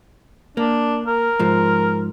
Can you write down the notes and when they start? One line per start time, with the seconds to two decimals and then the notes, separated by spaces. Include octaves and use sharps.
0.57 A#3 D4
1.06 A#4
1.39 G#2 F3